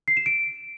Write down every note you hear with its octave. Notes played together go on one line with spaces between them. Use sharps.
C7
E7
D7